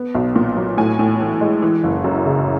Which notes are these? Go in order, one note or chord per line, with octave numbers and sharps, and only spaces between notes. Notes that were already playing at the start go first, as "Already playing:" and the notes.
Already playing: B3
B1
A#2
F#3
A2 G#5
A2
E3
G#3
E3
F#1
F#2
C#3